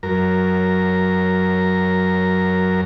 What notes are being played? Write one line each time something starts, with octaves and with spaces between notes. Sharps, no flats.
F#2 A#4